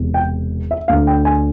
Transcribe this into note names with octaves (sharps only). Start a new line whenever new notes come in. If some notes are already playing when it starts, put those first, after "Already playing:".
Already playing: E1 E2 C3
G5
E5
D2 D3 F5
G5
G#5